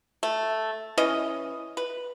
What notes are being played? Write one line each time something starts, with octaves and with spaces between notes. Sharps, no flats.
A3
E3 C#4 D#5
B4